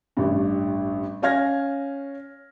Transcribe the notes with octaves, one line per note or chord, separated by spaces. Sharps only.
A1 G2
C#4 F5 F6 G#6 A#6